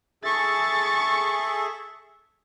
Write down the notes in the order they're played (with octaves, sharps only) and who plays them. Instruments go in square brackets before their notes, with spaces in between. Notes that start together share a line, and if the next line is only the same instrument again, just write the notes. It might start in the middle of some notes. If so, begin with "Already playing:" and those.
[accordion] G#4 A4 E5 [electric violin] C#6 A6